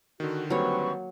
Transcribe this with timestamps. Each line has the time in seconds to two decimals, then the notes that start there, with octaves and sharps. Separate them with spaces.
0.20 D3 D#3 F#4
0.50 F#3 G3 A#3 C4 B4 C#5 C#6